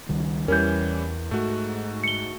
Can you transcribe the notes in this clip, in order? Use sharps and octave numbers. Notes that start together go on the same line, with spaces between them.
C#2 D#3 G3
E2 E3 G3 C#4 A#4 G6
G#2 A3 F#4
C#7 G7